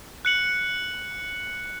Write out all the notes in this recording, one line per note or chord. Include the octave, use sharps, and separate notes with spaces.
F#6 C#7 F#7